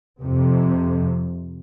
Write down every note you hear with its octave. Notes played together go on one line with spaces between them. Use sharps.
F2 C3